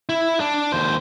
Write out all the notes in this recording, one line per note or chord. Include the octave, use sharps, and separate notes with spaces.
E4
D4
D#2 C5